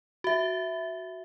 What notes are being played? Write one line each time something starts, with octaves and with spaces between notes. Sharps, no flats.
F#4 E5